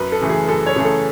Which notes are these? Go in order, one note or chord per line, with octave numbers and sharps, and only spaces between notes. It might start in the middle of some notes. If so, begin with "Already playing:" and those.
Already playing: F#2 B4
A4
C#3 E3 A3
G#4
F#2 A4
C#5
C#3 E3 A3 G#4
A4